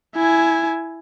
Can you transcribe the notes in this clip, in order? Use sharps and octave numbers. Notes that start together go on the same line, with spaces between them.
E4 G#5